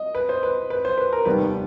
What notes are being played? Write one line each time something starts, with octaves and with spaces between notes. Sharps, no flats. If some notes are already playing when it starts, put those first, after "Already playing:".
Already playing: D#5
B4
C5
B4
B4
C5
B4
A#4
F1 D#2 D#3 G3 B3 B4